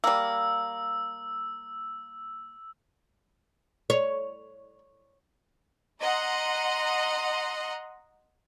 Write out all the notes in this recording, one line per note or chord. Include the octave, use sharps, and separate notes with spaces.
G3 A#3 E6
C#5
D#5 F#5 A#5 C6